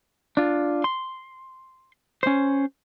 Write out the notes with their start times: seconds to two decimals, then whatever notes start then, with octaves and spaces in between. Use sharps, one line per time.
0.37 D4 F4
0.84 C6
2.23 C#4 C5